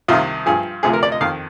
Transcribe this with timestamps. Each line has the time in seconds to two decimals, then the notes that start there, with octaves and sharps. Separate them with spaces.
0.08 C2 C3 D#3 F4
0.46 G2 F3 G#4
0.83 D2 C3 F3 G#4
0.93 A#4
1.03 D5
1.12 D#5
1.21 F2 D#3 F5